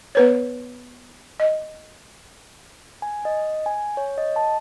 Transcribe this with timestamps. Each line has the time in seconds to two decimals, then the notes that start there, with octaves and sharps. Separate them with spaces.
0.15 B3 B4 C#5
1.40 D#5
3.02 G#5
3.25 D#5
3.66 G#5
3.97 C#5
4.18 D#5
4.36 A5